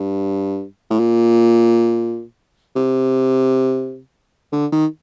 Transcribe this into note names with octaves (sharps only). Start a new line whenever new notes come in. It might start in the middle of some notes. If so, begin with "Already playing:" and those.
Already playing: G2
A2
A#2
C3
D3
D#3